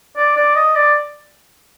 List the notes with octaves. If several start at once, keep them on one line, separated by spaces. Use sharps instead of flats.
D5
D5
D#5
D5